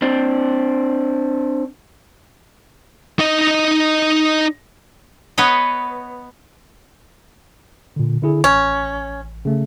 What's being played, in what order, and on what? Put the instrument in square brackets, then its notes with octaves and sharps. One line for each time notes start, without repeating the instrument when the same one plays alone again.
[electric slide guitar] C4 D4 C5 D5
[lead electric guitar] D#4 D#5
[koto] B3 B4 C#5 D#5
[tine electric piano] A#2 D3
D3 E4 G#4
[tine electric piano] A1 [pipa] C#4
[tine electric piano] C#3 A3